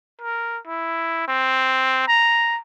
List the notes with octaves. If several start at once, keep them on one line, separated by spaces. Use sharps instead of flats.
A#4
E4
C4
A#5